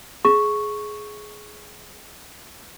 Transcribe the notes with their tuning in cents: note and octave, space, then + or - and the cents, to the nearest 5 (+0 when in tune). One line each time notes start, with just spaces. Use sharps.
G#4 +15 C#6 +0